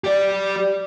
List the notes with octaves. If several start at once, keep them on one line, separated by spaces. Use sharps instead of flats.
G4 D5